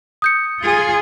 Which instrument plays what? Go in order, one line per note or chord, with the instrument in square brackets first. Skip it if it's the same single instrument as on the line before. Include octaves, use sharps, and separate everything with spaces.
[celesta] D#6 G6 C#7
[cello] F4 G#4